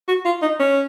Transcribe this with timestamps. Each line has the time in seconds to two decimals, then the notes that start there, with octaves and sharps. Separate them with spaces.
0.08 F#4
0.25 F4
0.42 D#4
0.59 C#4